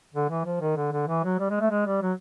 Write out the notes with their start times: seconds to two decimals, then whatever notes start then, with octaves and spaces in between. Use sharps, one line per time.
0.14 D3
0.30 E3
0.45 F3
0.61 D#3
0.76 D3
0.92 D3
1.08 E3
1.24 F#3
1.40 G3
1.50 G#3
1.60 A3
1.71 G#3
1.86 G3
2.02 F#3